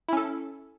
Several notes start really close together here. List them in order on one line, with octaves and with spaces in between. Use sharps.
E4 C#4 A4